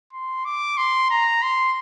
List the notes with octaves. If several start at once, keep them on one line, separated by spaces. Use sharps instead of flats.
C6
D6
C6
A#5
C6